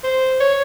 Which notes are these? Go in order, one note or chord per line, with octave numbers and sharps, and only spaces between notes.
C5
C#5